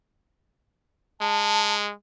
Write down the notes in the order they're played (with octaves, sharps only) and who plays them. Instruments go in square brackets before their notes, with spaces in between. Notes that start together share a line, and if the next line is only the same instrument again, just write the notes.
[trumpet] G#3 [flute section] A5